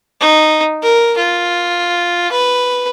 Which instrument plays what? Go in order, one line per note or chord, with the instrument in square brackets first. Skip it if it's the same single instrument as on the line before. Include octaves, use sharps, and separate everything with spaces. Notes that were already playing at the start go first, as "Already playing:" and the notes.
[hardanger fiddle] D#4
A#4
F4
B4